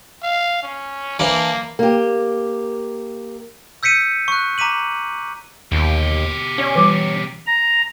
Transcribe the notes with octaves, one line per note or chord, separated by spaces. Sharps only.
F5
C#4
E3 A#3 D4
A#3 G4
E6 G6 B6 C#7 D#7
C#6 F#6
A#5 D6 B6 D#7 F#7
D#2 B2 G4
C#4 C#5 D5
E3 G3 D6
A#5